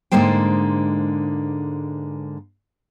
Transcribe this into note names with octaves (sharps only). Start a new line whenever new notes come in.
G#2 D3 G#3 A#3 C5 G5